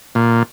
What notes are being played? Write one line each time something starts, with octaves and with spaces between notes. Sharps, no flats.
A#2